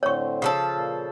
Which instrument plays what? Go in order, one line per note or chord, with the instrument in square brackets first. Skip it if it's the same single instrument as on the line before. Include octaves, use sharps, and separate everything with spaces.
[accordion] A2 D3 C4 [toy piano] C#5 C#6
[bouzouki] C#3 F3 A4
[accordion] A#2